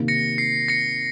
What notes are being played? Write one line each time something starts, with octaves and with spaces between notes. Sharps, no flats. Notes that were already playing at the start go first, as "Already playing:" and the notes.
Already playing: C3 D#3 A#3
A#6 C#7
C7
A#6 C#7